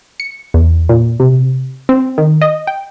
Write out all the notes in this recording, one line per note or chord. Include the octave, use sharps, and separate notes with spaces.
C#7
E2
A#2
C3
C4
D#3
D#5
G5